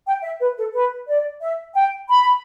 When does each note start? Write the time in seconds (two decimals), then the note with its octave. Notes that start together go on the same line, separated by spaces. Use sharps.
0.06 G5
0.23 E5
0.40 B4
0.57 A4
0.74 B4
1.08 D5
1.40 E5
1.74 G5
2.09 B5